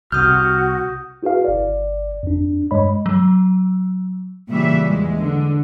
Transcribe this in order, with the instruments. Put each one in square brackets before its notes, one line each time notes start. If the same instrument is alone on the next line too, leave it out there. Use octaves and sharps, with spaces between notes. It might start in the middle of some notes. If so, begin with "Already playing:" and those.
[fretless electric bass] C2 C3 [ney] F#4 [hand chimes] D#6 G6 [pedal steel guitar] F6
[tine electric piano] E4 F#4 G#4 B4 F5
G1 D5
F2 D4
G2 G#3 C#5 D#5 B5
[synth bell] F#3
[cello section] A#2 C#3 E3 G3 E5
E2 G#3
D3